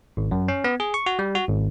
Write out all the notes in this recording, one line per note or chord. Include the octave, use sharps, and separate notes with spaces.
G#1
F#2
C#4
B3
G#4
C#6
F#4
G3
F#4
G#1